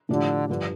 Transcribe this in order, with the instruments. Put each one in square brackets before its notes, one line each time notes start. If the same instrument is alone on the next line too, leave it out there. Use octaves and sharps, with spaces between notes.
[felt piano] A2 F3 D4 G4 [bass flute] D3
[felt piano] G2 F3 [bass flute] D3